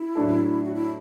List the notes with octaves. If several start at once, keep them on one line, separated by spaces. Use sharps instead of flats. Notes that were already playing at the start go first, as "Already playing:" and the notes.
Already playing: E4
A2 F#3 A3 D4 A4
F#4
E4